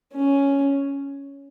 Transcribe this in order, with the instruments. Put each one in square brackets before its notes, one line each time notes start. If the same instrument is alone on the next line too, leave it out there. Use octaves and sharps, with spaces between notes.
[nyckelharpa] C#4